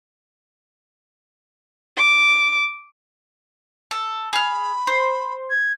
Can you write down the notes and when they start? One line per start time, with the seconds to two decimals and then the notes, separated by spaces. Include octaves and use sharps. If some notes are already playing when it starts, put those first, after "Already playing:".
1.97 D6
3.91 A4
4.33 G#4 B5 F6
4.87 C5
5.50 G#6